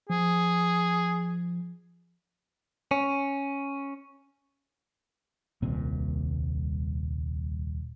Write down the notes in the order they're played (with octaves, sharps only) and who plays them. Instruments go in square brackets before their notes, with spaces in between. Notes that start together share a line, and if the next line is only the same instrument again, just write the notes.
[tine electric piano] F3 [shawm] G#4
[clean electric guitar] C#4
[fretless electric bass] D#1 C2 A#2 C4